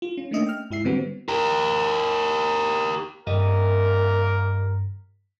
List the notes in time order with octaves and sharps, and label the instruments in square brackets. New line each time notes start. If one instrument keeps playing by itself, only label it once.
[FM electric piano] F4
C#4
A3 A#3 C#4 D4 D#5 E5
G5 F6
G#2 E4 E5 C7
D3 G3 B3 C4 F#4
[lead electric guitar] G4 A#4
[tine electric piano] G2 [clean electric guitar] G3 G4 D#5 [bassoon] A#3 [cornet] A#4